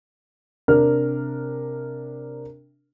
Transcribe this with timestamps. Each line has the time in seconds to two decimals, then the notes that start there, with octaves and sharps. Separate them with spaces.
0.68 C3 D4 A#4 F6